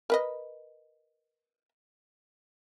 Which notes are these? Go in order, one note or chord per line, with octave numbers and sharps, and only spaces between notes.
A#4 B4 D#5